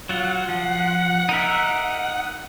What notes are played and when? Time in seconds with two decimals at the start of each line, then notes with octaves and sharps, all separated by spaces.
0.09 F#3 F4 F#5
0.49 F3
1.29 D#4 A#4 E5